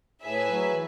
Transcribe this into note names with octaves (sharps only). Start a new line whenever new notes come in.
A2 G#4 B4 E5 G#5
F#3
E3